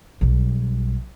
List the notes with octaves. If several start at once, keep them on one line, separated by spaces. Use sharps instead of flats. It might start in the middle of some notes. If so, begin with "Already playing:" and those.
B1 G3